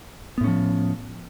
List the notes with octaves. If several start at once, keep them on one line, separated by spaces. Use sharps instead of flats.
A2 F3 B3 C#4